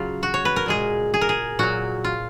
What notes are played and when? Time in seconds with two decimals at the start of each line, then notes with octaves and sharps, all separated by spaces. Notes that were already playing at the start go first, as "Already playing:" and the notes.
Already playing: C#3 F#3 F4 G#4
0.23 F#4
0.34 C#5
0.45 B4
0.56 A#4
0.66 A#2 G#3 G#4
1.14 G#4
1.21 A#4
1.29 G#4
1.59 A#2 F#3 F#4
2.04 F4